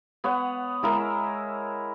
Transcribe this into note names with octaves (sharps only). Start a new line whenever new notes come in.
B3 C#5 F#5
G#3 E4 A#4 E5